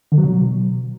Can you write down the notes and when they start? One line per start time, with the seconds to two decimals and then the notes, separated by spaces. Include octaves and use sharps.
0.12 D3
0.18 F#3
0.24 B2